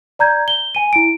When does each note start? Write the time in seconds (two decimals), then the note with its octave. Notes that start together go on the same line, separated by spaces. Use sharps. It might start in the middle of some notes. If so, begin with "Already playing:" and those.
0.19 D5 A#5 G6 G#6
0.48 G7
0.75 G#5 D#7
0.93 E4 D7